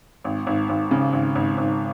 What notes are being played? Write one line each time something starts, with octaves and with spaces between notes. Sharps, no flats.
G#1
G#1
G#1
C#3
G#1
G#1
G#1